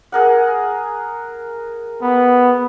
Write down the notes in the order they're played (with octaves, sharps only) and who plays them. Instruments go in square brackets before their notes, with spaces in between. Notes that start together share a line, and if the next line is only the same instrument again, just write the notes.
[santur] G#4 A#4 F#5
[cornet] B3